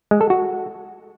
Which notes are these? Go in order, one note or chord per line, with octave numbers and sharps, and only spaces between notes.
G#3
A4
F#4